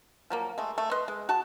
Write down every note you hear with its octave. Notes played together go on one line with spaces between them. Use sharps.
F3 F#3 A#3
G#3 A3
A3
B4 D#5 C6
G#3
F#4 A5